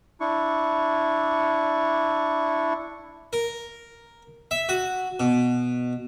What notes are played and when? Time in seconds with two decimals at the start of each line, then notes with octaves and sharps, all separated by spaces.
0.20 D4 E4 C#6
3.33 A#4
4.51 E5
4.69 F#4
5.20 B2